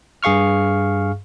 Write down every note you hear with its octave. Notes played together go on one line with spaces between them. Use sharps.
G2 G#4 F5 C#6 F6